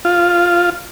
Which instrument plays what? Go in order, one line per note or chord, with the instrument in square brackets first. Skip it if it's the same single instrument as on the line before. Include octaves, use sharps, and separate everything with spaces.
[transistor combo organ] F4